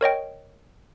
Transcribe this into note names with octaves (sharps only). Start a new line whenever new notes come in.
A#4 C#5 D#5 G5